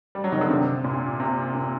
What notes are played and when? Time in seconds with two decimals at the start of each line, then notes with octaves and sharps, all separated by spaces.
0.15 G3
0.24 F#3
0.32 D#3
0.41 D3
0.50 C3
0.84 A#2
1.20 C3
1.55 A#2